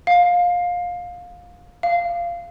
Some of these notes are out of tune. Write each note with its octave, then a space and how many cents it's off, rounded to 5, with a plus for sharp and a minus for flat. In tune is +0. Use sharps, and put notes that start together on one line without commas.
F5 +20
F5 -15